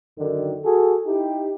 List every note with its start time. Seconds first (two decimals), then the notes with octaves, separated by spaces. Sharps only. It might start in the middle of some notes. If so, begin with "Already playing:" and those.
0.18 F#2 D3 D#3
0.65 F#4 G#4 A4
1.06 D#4 E4 G4